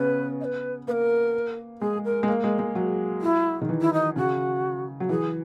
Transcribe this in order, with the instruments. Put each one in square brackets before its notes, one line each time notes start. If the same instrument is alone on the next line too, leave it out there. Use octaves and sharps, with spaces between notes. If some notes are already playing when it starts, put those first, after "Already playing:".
Already playing: [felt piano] C#3 B3 C#4 [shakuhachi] B4
[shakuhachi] D#5
B4
[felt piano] A#3 [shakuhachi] A#4 B4
[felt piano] G#3 [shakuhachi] G#4
[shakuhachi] A#4
[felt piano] G#3
A#3
G#3
G#3
F#3
[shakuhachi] E4
[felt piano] D#3
E3
[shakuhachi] E4
D#4
[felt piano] C#3 [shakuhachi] F#4
[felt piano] F#3
[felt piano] E3 [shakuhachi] G#4